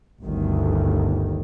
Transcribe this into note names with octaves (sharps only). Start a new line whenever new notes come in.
G1 D2 D#3